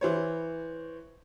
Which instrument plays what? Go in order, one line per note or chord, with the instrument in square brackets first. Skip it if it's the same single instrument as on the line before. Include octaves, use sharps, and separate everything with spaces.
[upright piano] E3 C5 C#5